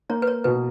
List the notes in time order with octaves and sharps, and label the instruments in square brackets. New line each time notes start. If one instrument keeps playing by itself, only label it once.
[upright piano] A#3 [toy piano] C#5
[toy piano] B4
C#5
[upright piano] B2 [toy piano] B4